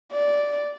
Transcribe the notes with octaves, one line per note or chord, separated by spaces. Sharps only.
D5